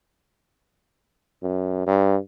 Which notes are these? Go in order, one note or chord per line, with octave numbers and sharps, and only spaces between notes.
F#2
G2